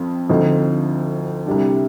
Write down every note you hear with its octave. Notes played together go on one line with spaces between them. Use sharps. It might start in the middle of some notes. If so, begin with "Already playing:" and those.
Already playing: F2 F3 C4
D2 D3 F3 C4 D#4
C2 C3 G3 D4